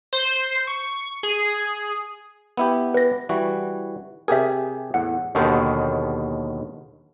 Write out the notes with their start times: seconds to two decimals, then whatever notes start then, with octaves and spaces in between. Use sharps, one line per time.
0.13 C5
0.67 C#6
1.23 G#4
2.57 B3 E4 G4
2.94 B4 A#6
3.29 E3 G3 F#4
4.28 C3 G4 G#4 A#4 E5
4.94 E2 A2 F#5
5.35 D#2 B2 D3 D#3